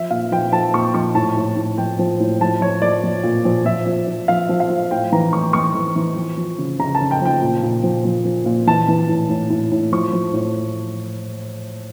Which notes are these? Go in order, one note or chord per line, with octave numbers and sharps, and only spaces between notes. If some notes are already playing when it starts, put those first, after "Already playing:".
Already playing: F3 E5
A#2 F5
F3 G5
F3 A5
A#2 C#6
F3 C#6
A2 A5
A2
A2
F3 G5
F3
A2
F3 A5
F3 C#5
F3 D5
F3
A#2
F3
F3 E5
F3
F3
F3 F5
F3
F5
F3
A2 G5
E3 A#5
A2 C#6
E3 C#6
E3
E3
F3
F3
C#3
C#3 A#5
A5
C#3
G5
F3 G5
A#2
A#2
F3
F3
F3
A#2
E3 A5
E3
A2
A2
A2
A2
F3 C#6
F3
A2